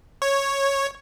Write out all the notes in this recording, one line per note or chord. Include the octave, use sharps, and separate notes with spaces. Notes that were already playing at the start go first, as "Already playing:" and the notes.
C#5